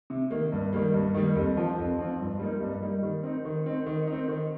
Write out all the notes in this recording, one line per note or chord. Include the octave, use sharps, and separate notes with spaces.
C3
D#3 A#3
G2
D#3 G3 A#3
G2
D#3 G3 A#3
F2
F3 C4 F4
F2
F3 C4 F4
G2
G3 A#3 D#4
G2
G3 A#3 D#4
D#3
C4 D#4
D#3
C4 D#4
D#3
C4 D#4
D#3